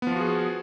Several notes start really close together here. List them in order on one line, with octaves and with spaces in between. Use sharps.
B3 F3 F4 F#4 G#4